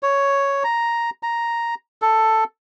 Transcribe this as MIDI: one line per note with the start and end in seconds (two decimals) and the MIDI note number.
0.03 0.63 73
0.64 1.10 82
1.23 1.75 82
2.02 2.44 69